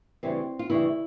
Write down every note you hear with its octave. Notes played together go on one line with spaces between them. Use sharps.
D2 C#3 E3 G3 C4
F4
D2 C#3 E3 G3 E4